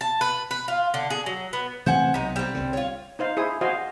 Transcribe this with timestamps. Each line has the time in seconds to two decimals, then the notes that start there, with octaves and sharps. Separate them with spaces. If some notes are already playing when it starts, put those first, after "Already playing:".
0.01 A5
0.21 B4
0.51 B4
0.68 F4
0.94 D3
1.10 G#4
1.26 F#3
1.53 B3
1.86 C3 E3 A3 C5 F#5 G#5
2.14 B1 C3 D#4
2.36 G3 C4
2.54 C2 D3
2.73 F4 C#5
3.19 D#4 C5 F5
3.37 E4 G#4 C5 D#6
3.61 F#4 C5 D#5 F5 G#5